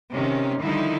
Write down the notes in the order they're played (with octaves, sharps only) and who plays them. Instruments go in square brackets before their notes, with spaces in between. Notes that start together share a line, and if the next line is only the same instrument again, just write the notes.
[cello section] C3 D#3 C#4
D3 D#3 F3 G3 D#4 E4